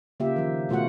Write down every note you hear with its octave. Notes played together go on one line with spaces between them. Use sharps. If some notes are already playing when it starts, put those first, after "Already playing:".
C#3 A#3 F4 G4 E5
D#3 F3
B2 A3 F4 F#4 F#5